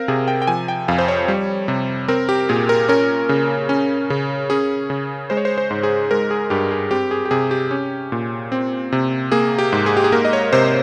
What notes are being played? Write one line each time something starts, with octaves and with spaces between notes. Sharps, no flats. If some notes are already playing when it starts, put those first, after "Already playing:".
Already playing: C4 A#4 F5
C3 G#4
G5
G5
F3 G#5
G5
F2 F5
C5
C#5
G3
C3
C4 A#4
G4
A#2 G#4
A#4
C#4 A#4
C#3
C#4
C#3
C#4 G#4
C#3
G#3 C5
C#5
C5
C5
G#2
G#4
G#3 A#4
G#4
G2 G4
G#4
C4 G4
G#4
G4
C3 G#4
G4
C#4
A#2
C4
C3
A#3 G#4
G4
G#2
G#4
G4
G#4
A#3 A#4
D#5
C#5
C3 C5